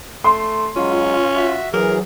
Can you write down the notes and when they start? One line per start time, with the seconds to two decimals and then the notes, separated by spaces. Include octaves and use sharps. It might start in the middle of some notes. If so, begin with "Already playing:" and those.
0.24 A3 C6
0.76 F#3 G#3 C#4 F4
1.35 F#4 E5
1.73 E3 F#3 G#4 A#4